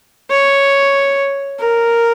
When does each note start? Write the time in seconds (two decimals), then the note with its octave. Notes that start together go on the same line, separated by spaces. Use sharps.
0.31 C#5
1.59 A#4